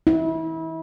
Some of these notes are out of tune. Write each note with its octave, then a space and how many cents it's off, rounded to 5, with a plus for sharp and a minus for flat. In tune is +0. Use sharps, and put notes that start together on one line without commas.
E4 -30